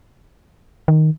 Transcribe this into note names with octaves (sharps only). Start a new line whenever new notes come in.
D#3